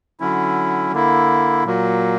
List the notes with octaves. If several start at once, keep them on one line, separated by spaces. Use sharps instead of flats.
D3 F#3 C#4 E4
D3 A#3 E4
A#2 F#3 A#3